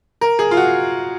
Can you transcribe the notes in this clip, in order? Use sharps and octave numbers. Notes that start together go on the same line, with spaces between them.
A#4
G#4
F4
F#4